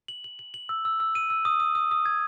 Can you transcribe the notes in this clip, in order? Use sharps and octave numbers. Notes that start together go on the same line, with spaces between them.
F#7
F#7
F#7
F#7
E6
E6
E6
D#7
E6
D#6
D#6
D#6
D#6
G#6